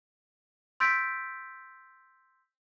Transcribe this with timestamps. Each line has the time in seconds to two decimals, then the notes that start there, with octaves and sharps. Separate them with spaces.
0.80 C6 E6 G6 A6 B6 D7